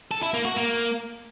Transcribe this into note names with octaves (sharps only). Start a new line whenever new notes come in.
A4
E4
A#3
F#4
A#3